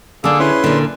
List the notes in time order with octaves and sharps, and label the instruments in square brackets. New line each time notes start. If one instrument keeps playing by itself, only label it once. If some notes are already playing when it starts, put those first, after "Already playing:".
[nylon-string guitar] D3 D4 [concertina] A#3 G#4 A4
[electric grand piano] C#4 E4 G#4 [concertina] B4 C6
[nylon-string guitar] A#2 D3